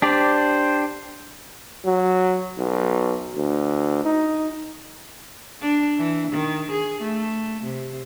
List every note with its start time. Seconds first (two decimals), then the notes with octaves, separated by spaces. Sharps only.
0.02 D4 G4 C5 D5
1.85 F#3
2.58 B1
3.35 D2
4.05 D#4
5.62 D4
5.98 E3
6.31 D#3
6.71 G#4
7.02 A3
7.64 C3